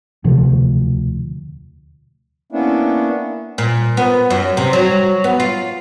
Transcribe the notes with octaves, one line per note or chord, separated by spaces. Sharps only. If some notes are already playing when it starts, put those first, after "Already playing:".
E1 D2 C3 F3
A#3 B3 C#4 D4 E4
A#2
B3
F#2
C3
F#3
B3
F4